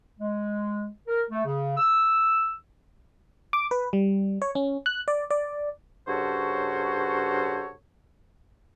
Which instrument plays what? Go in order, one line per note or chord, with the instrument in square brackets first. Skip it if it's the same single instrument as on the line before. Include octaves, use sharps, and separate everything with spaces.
[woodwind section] G#3
A#4
A3
C#3
E6
[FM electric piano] D6
B4
G3
C#5
C#4
F#6
D5
D5
[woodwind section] G2 C#3 F#4 A4 C5 C#5